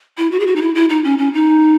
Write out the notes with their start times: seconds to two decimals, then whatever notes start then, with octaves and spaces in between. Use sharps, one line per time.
0.18 E4
0.32 F#4
0.40 G#4
0.47 F#4
0.56 D#4
0.62 E4
0.75 E4
0.90 D#4
1.04 C#4
1.18 C#4
1.34 D#4